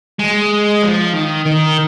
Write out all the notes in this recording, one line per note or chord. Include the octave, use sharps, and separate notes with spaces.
G#3
F3
D#3
D#3